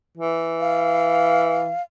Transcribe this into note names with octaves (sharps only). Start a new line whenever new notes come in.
E3
F5